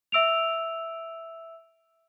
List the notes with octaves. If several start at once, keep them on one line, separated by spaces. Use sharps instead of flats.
E5 E6 D7 F7